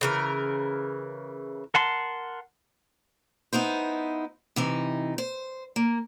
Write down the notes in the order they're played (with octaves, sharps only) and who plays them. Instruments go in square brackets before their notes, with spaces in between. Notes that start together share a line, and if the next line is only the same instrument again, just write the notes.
[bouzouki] C#3 E3 A#4
[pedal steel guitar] A#4 F#5 A5 C6
[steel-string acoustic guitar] B3 D#4 E4 C5
C3 E3 D#4
C5
A#3